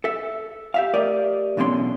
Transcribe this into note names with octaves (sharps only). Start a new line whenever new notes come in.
A4 E5
G4 E5 F5
A3 G4 A#4 D5 D#5
B1 E2 B2 D3 C#4 C6